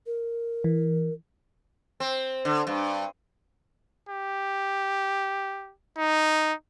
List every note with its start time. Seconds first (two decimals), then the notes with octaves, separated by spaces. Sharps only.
0.06 A#4
0.64 E3
2.00 C4
2.45 D3
2.67 G2
4.09 G4
5.98 D#4